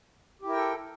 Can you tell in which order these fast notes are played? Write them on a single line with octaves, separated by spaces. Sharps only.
G4 E4 A#4 G5 A4